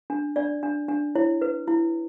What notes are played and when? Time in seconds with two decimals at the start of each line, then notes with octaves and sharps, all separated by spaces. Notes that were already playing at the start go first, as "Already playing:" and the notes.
0.10 D4
0.36 D4 D5
0.63 D4
0.88 D4
1.15 E4 C#5
1.41 B4
1.68 E4